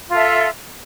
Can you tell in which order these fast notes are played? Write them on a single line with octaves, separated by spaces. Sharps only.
F4 A4 E5